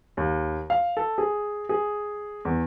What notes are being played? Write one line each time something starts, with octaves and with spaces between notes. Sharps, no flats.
D#2
F5
A4
G#4
G#4
E2